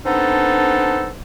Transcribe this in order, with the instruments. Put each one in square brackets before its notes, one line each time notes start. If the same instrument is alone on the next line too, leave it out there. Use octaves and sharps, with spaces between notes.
[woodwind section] B3 C4 D4 D#4 A4